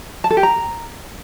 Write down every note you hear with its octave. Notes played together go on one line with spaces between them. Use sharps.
A5
A4
G4
A#5